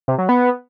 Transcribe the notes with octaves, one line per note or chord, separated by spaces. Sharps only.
C3
F#3
B3